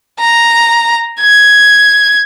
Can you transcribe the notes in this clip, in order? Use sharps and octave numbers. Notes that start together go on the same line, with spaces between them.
A#5
G#6